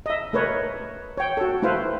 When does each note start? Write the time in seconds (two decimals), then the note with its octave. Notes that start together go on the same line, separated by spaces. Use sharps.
0.06 D#5 E5
0.33 A3 A#4 B4 C#5
1.18 C#5 G5
1.37 F#4 A4
1.62 A3 E4 B4 C5 F5